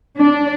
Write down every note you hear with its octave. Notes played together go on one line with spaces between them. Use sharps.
D4